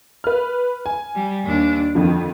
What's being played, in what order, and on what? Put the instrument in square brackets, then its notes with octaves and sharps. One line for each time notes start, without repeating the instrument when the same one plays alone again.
[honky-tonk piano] B4 F6
G#5
[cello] G3
D#2 D4
[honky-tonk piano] F2 D3 F3 [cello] D#3